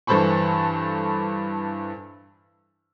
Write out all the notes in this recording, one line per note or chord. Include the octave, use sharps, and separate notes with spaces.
G2 E3 A4 C5 B5 C#6